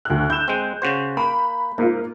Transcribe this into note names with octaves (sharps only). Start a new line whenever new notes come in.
D2 F#6
E4 G6 E7
G#3 C4
C#3 F#4 C5
A#3 B5
G#2 A#3 F4